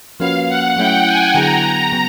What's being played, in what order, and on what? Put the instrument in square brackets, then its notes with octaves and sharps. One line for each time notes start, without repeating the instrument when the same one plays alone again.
[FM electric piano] F3 A#3 C#4 F#4 B4 [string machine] F5
[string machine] F#5
[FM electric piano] F#3 A3 C#4 E4 [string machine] G5
[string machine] G#5
[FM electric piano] D3 F#3 B3 E4 G#4 [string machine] A#5
[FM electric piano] C#3 F#3 B3